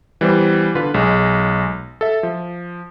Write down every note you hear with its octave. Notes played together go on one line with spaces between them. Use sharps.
E3 G3 B3 C5
D3 F4 B4
B1 G#3
A4 E5
F3